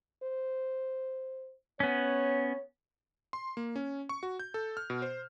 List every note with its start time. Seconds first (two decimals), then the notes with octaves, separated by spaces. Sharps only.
0.23 C5
1.80 B3 C#4 C#5
3.33 C6
3.57 A#3
3.76 C#4
4.09 C#6
4.23 F#4
4.40 G6
4.54 A4
4.77 F6
4.90 B2
5.02 C5